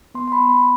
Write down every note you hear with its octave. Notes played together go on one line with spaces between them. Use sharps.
B3 C6
C6
B5
B3
B5